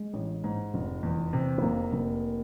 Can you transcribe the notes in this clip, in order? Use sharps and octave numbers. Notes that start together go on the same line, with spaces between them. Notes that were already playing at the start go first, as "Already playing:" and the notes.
Already playing: G#3
A1
G#2
F1
E2
C3
B3
F1 A#3
F1